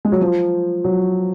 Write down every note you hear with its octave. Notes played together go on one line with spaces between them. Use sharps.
G#3
F#3
F3
F#3